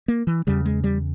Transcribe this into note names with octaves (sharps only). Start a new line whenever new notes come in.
A#3
E3
E2 C#3 G3
G#3
G3